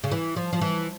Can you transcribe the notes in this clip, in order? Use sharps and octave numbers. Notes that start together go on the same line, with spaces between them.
C#3
E3
F3
F3
E3